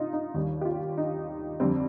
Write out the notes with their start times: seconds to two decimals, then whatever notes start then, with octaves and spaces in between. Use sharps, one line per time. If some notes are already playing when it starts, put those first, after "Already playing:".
Already playing: C3 D#4 F4
0.13 D#4
0.34 D#2 D#3 G3
0.61 G4
0.65 F4
0.97 D#4
1.60 F2 D3 G3 C4